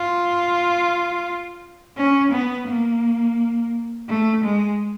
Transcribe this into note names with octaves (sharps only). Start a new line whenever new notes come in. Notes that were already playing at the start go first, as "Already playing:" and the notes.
Already playing: F4
C#4
B3
A#3
A3
G#3